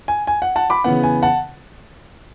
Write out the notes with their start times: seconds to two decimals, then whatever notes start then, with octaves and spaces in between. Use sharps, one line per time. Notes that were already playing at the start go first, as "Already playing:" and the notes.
0.08 G#5
0.27 G#5
0.42 F#5
0.56 F#5 A5
0.70 B5 D6
0.84 C#3 E3 B3 F#5
1.04 G#5
1.23 F#5 A5